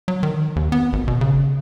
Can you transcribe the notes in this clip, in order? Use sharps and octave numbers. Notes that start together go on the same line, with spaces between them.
F#3
D#3
D#2
B3
G#1
B2
C#3